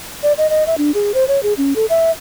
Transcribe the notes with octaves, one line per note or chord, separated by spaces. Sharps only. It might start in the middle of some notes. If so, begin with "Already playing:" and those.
D5
D#5
D#5
E5
D4
G#4
C5
C#5
G#4
C#4
A4
E5